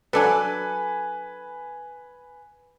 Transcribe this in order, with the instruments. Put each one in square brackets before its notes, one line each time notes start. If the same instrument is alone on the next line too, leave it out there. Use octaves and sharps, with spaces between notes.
[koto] F#3 D4 A4 [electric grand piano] B4 G#5